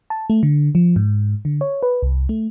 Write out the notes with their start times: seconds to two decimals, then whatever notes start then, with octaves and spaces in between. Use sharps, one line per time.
0.10 A5
0.30 A3
0.43 D3
0.75 F3
0.96 G#2
1.45 D3
1.61 C#5
1.83 B4
2.03 C2
2.29 A3